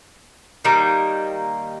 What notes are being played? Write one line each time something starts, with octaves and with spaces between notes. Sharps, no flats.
D#3 G3 A#3